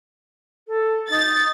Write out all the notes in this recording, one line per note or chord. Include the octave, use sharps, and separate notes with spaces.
A4
D#4 A6